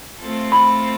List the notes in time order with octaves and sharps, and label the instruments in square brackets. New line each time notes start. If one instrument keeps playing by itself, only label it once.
[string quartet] A3 C4 F4 A4
[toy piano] B5